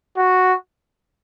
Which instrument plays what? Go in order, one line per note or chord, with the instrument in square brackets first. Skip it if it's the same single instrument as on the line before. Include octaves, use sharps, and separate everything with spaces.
[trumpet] F#4